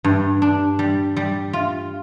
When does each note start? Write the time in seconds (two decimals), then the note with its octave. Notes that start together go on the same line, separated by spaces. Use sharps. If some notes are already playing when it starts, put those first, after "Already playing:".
0.04 G2
0.42 D4
0.79 G3
1.17 G3
1.53 F4